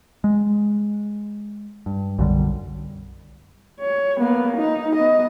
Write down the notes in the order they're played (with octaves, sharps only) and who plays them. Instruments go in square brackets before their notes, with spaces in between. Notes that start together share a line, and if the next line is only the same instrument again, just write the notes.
[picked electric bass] G#3
G2
B1 F#2 D3 G3
[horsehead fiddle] C#5
A#3 B3
D#4
B3 D#5